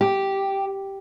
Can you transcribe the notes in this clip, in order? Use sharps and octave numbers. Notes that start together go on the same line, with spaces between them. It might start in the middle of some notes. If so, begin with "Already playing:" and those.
G4